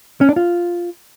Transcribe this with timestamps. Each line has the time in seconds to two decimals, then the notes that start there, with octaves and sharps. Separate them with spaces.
0.21 C#4
0.29 D4
0.36 F4